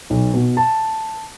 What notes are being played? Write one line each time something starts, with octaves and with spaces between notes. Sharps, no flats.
B1
B2
A5